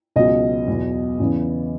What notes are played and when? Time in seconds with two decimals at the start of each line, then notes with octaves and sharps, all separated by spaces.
0.16 C#2 B2 F#3 D#5
0.68 E2 B2 F#3
1.19 E2 C#3 E3